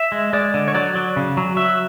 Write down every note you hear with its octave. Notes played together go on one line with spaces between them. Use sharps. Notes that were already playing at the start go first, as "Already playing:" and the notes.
Already playing: E5
G#3
G#3 D5
D3
C#5
F#3 D5
F#3
C#3
F#3
F#3 E5